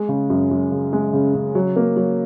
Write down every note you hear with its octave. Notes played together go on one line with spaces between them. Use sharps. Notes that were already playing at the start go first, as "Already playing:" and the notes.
Already playing: G#3
C#3
F#2
F#2
C#3
G#3
C#3
C#3
F#3
A#3
F#3